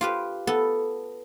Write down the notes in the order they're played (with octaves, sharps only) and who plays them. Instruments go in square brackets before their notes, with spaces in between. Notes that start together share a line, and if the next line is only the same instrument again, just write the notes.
[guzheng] F4 G4 B4
B3 A4